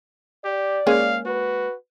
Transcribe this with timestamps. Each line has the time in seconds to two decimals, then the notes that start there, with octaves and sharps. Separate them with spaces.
0.45 G4 D5
0.87 G#3 A#3 C#4 F5
1.26 F#4 B4